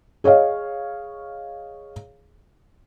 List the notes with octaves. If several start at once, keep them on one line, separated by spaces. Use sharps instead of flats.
G#4 C#5 D#5 F5